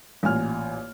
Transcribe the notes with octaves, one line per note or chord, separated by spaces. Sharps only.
A1 A#2 G#5 F6